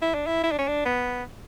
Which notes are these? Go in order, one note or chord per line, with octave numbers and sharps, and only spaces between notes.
E4
D4
E4
E4
D4
C#4
D4
B3